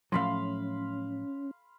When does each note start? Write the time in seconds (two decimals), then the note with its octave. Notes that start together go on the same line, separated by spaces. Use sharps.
0.12 A2 F3 F#3 C#4 F5 B5 C6